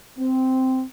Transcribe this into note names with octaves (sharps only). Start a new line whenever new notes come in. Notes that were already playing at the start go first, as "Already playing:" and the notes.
C4